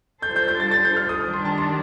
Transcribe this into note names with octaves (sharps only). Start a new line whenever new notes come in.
G3 D4 F4 A4 C5 G6
G6
G6
A6
A6
G6
F6
D#6
D#3 G3 D4 D#6
C6
A5
C6